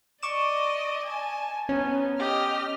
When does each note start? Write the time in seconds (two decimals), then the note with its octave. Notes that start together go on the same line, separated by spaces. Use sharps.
0.23 D5 D#5 C#6 D6 E7
1.06 G#5 A5
1.69 B3 C#4 D#4
2.19 G4 D#5 F6